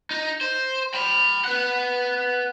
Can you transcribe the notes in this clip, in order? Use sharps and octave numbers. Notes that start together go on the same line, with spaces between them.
D#4
C5
G5 B5
B4 F#5